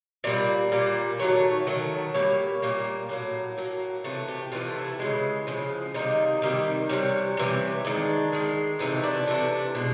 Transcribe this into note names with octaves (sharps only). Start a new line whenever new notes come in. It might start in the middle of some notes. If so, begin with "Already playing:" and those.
A#2 G3 A#3 D5
A#2 G3 A#3
D#3 F#3 A3 C#5
D#3 F#3 A3
A#2 G3 A#3 C#5
A#2 G3 A#3
A2 F#3 A#3
A2 F#3 A#3
C3 E3 A3
G4
C3 E3 A3 F4
E4
C#3 F3 G#3
C#3 F3 G#3
C3 D#3 G3 A#3 D#4
C3 D#3 G3 A#3
C3 E3 G3 C#4
C3 E3 G3
D#3 G#3 D4
D#3 G#3
C3 E3 A3 D#4
D4
C3 E3 A3
B2 G#3